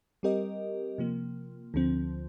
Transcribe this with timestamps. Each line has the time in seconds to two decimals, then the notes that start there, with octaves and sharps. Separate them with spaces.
0.23 G3 C4 G4 A#4 D#5
0.98 C3 F3 A#3
1.74 D2 D3 F3 C4